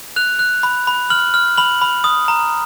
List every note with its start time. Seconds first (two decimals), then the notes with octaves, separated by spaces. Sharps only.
0.16 F#6 F7
0.39 F#6
0.63 B5
0.87 B5
1.10 F6 F#7
1.34 F6
1.57 B5 F#7
1.82 B5
2.04 D#6
2.28 A#5